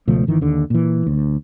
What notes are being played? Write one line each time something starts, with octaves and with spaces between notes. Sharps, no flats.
C#2 B2 F3 A3
G1 D#3 E3
D#2 D3
A#2 E3
D2